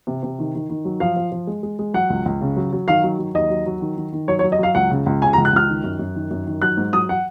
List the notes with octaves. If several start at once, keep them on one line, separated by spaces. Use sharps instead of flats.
C3
C3
D#3
D#3
D#3
F#3
F3 F5
F3
F3
G#3
G#3
G#3
F#3 F#5
C#2
C#2
C#3
F#3
F#3
D#3 F5
F#3
F#3
D#2 D#5
F#3
F#3
D#3
D#3
D#3
F#3 C#5
C#5
F#3
D#5
F#3 F5
C#2 F#5
C#3
C#2
C#3 G#5
A#5
C#2
F#6
C#2 F6
D#3
F#2
F#2
D#3
F#2
D#3
F#3 F#6
G#2
F#3 D#6
F#5